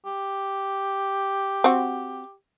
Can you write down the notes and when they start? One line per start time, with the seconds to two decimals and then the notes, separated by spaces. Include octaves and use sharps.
0.06 G4
1.64 C4 F#4